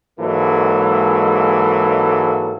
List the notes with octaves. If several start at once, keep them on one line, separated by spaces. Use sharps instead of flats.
G#2 E3 F#3 G#3 A#3 A4